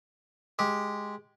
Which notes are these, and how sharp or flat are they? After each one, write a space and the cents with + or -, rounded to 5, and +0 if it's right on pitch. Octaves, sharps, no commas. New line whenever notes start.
G#3 +0 G4 +0